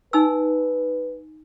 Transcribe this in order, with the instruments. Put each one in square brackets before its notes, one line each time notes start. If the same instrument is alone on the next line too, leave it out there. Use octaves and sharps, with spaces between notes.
[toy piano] D#4 G#5 E6 [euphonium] B4